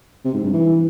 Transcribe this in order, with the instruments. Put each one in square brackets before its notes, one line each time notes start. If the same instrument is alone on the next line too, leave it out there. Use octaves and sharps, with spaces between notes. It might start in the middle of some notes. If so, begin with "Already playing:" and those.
[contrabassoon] C3
G#2
G2
E3